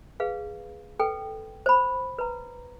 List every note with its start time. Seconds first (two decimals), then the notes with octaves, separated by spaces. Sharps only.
0.20 G#4 B4 F5
1.00 A4 B4 G5
1.66 C5 B5
2.19 B4 A#5